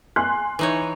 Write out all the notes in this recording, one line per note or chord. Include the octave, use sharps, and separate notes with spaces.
G#5 C6 F#6
E3 D#4 C#5